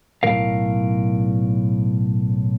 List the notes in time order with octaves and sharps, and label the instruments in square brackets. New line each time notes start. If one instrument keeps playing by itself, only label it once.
[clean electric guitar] B1 A2 D#3 A#4 F5